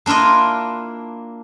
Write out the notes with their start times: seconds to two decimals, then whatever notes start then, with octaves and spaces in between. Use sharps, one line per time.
0.06 A#3 D4 E4 F4 D#5